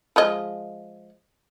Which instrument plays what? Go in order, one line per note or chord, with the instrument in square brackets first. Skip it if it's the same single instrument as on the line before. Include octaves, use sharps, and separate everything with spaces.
[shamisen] F3 G#3 D#5